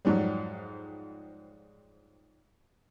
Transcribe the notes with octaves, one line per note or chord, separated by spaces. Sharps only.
F2 G#2 F#3 G3